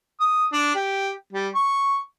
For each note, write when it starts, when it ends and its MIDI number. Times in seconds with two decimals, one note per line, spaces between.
0.21 0.45 87
0.53 0.72 62
0.75 1.11 67
1.33 1.48 55
1.55 1.98 85